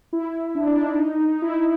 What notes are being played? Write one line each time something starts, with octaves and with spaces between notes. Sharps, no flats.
E4
D4
D4
D#4
D#4
D#4
E4